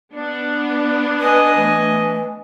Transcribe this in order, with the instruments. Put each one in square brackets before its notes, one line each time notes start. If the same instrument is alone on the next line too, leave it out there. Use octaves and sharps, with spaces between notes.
[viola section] B3 D4 [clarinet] D5
[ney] B4 [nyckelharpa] D#5 G#5
[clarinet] E3 [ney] A3